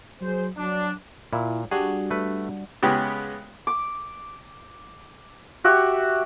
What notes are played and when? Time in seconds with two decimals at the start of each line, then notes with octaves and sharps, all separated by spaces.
0.21 F#3 G#4 C5
0.57 F#3 D4
1.33 A#2 E4
1.71 G3 D4 F#4 G#4
2.11 A3 B4
2.83 C#3 G#3 B3 G4
3.67 D6
5.64 F#4 G4 E5